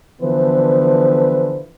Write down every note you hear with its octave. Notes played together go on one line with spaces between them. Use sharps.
D3 E3 F3 B3 B4 C5